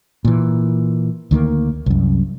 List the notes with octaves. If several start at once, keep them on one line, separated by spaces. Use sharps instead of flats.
A#2 E3
D2 D#3 A3 A#3
C2 F#2